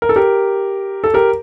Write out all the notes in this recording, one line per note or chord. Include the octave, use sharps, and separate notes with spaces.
A#4
A4
G4 A#4
A4
G4 A#4